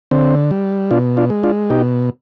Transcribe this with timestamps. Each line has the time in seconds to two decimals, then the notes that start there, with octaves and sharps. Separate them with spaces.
0.11 D3 C4
0.51 G3
0.91 B2 D4 F4
1.17 D4 F4
1.30 G#3
1.43 D4 F4
1.70 B2 D#4 G4